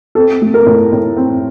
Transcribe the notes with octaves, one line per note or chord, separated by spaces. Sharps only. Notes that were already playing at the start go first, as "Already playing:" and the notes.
C4 A4
A3
A#4
A2
A2
C4